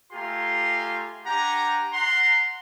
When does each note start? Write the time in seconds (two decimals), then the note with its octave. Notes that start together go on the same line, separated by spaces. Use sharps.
0.12 A3 F4 G4 G#5 A#5 C6
1.26 D4 G4 F#5 G#5 A#5
1.94 F#5 A#5 C6